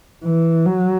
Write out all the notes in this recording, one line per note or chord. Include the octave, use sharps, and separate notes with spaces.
E3
F#3